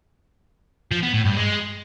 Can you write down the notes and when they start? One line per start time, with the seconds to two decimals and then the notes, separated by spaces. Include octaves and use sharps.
0.91 F3
1.03 B3
1.14 A2
1.25 G2
1.36 G#3